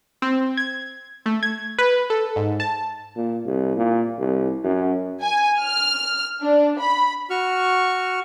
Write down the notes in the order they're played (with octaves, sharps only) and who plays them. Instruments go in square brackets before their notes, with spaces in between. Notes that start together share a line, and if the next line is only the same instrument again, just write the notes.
[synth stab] C4
G#6
A3
G#6
B4
A4
G#2
A5
[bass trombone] A#2
C2
A#2
C2
F#2
[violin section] G#5
F6
D4
B5
[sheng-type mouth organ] F#4 C#6 F6